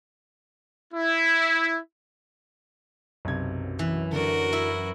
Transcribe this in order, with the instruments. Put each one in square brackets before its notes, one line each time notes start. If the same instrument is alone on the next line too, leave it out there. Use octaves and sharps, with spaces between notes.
[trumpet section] E4
[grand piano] B1 C3 G#6 [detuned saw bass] F#2
[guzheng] E3
[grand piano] D3 D4 [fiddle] F#4 A#4
[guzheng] E4